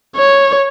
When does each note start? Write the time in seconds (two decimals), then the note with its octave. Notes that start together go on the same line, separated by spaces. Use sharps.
0.16 C#5